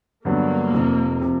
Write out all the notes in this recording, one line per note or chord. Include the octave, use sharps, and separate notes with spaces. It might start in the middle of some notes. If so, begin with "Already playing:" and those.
G2 D3 F#3 A#3 B3
F1 F2 C3
C3 F3